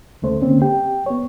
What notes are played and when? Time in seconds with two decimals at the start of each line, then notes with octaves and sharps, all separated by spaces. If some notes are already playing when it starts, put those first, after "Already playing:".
0.22 D2 C#3 A3 C5
0.42 D3 A#3 C4 C#4
0.62 G4 G5
1.06 B3 C#5